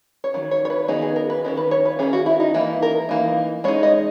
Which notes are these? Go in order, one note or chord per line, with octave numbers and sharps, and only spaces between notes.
C#5
D#3 F#3
C#5
C#5
B4
D#3 F#3 B3 D#4 G#4
G#4
A#4
B4
D#3 F#3 C#4 A#4
B4
C#5
B4
D#3 F#3 C#4 G#4
F#4
E4
D#4
E3 A#3 D#4 E4
A#4
E3 A#3 D#4
G#3 D#4 C#5
D#5